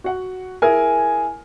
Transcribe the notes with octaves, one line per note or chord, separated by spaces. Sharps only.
F#4 F#5
E4 G#4 A#4 G#5